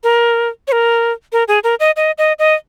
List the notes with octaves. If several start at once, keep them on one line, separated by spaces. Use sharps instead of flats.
A#4
C#5
A#4
A#4
G#4
A#4
D#5
D#5
D#5
D#5